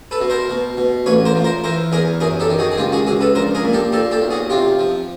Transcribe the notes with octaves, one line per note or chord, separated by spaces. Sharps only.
A4 B4
B2
A#4 C5
B2
B2
A1 B4 C#5
A#4 C5
F3
A#4 C5
E3 A#4 C5
E2 G#4 A#4
F#2 G#4 A#4
G4 A4
D#3
F#4 G#4
G#4
C#2 F4 G4
F#4 G#4
C#2 F#4 G#4
A4 B4
A#1 A#4 C5
G#4 A#4
A#2
G4 A4
A#2 G4 A4
G4 A4
B1
F#4 G#4
C3 F4 G4
F3